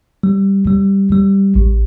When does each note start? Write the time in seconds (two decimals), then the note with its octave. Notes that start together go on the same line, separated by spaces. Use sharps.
0.23 G3
0.67 G3
1.12 G3
1.56 A1